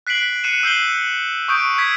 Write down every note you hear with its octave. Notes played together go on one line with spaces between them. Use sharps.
F#6 B6 C7 D7 F#7
F#6 C7 C#7 D#7 E7
E6 G6 C7 G7
C#6 D#6 G6 D7
E6 G#6 B6